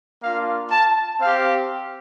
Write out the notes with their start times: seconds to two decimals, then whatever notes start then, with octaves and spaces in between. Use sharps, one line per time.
0.22 A#3 D4 F4 F5
0.70 A5
1.19 C4 G4 F5